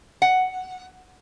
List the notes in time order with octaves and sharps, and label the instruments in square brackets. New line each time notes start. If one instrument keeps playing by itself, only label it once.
[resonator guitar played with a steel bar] F#5